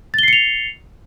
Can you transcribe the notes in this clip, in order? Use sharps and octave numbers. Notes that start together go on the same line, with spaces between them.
A6 C7 C#7 F7 G7